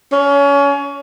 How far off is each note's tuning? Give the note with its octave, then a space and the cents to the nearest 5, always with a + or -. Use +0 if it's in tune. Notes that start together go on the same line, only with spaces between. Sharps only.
C#4 +25